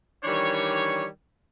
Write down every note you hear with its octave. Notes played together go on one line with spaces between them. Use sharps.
D#3 E3 G3 D4 C#5